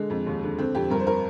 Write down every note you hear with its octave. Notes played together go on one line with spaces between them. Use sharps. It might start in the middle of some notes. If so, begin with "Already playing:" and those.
Already playing: D3 G#3
F2
D#2
D3
D3 C4
F2 G4
G2 A#4
C5
A#4